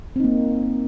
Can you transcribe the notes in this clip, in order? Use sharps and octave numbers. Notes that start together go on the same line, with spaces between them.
A#3 C4 D#4